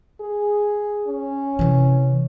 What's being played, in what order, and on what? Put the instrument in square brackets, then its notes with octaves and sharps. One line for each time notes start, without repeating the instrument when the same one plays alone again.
[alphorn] G#4
C#4
[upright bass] C3 E3